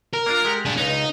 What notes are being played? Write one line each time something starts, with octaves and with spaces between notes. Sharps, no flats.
A#4
A#3 D4 F4
G#3 G4 F#5
D4 G#4
C#2 D#4 B4 C#5